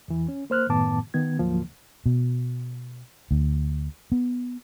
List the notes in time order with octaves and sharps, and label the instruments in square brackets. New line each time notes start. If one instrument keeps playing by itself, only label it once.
[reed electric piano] E2 E3
C#4
A#3 C5 F6 F#6
F#2 A2 D#3 B3 A5 D6
D#3 B3 G#6
D2 G#2 F3 F#3 A#3
[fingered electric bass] B2
D2
B3